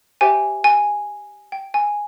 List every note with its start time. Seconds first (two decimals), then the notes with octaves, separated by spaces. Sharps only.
0.21 G4 C5 E5 G5 G#5
0.64 G#5
1.52 G5
1.74 G#5